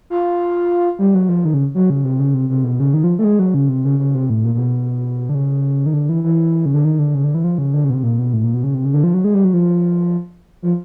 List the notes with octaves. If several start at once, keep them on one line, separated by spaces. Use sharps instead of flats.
F4
G3
F#3
F3
D#3
C#3
F#3
C#3
C3
C#3
C3
C3
B2
C#3
D#3
F3
A3
G#3
F#3
C#3
C3
C#3
C#3
C3
A2
A#2
A#2
B2
D3
C#3
D#3
D3
E3
E3
C#3
D3
D#3
D3
C#3
D3
E3
F3
C#3
D3
C#3
B2
C3
A#2
B2
A2
A#2
B2
C#3
C3
C#3
D3
F3
F#3
G#3
G3
F#3
F3
F3